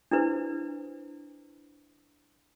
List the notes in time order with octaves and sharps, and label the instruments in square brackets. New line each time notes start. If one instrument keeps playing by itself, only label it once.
[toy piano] D4 E4 B4 C5